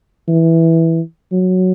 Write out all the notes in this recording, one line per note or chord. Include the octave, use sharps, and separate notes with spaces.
E3
F#3